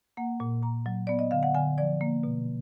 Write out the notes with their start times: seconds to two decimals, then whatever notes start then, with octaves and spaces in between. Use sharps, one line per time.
0.17 A#3 F#5
0.40 A#2
0.63 A#2 A#5
0.86 F#3
1.07 B3 D5
1.19 D#5
1.31 D3 F5
1.43 F#5
1.55 D3 G#5
1.78 F3 D5
2.01 A#3
2.23 B2